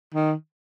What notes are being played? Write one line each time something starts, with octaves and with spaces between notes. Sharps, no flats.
D#3